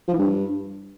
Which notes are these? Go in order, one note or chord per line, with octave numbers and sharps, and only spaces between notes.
F3
E3
G2